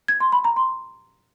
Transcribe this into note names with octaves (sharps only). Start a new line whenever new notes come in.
G#6
C6
B5
A#5
C6